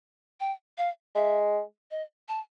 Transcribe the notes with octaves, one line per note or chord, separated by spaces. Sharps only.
G5
F5
G#3 E5
D#5
A5